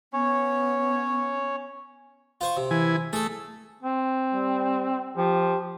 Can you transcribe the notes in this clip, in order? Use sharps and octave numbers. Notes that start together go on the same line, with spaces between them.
B3 C#4 C#5
F4 C5 C#6
C3
E3 G#5
A3 G#4 A4
C4
G3
F3 G4